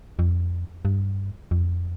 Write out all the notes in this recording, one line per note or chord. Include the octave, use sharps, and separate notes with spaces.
F2
G2
F2